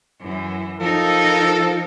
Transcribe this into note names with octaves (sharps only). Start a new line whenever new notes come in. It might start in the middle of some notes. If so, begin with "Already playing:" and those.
F#2 E3
F3 D#4 A4 A#4